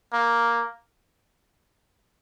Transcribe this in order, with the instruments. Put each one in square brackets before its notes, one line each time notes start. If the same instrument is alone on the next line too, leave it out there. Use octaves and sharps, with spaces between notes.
[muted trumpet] A#3